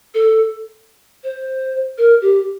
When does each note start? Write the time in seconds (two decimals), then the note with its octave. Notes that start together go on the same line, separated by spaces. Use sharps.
0.14 A4
1.24 C5
1.98 A#4
2.22 G4